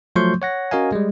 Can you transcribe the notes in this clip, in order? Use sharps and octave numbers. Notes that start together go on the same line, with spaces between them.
F3 F#3 A3 C6 C#6 G6
C#5 F#5 A#6
C#4 F#4 A#4 D#5 F5 G#5
G3 G#3